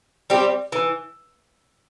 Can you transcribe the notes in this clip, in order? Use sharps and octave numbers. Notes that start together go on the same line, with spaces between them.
G3 C4 G4
E3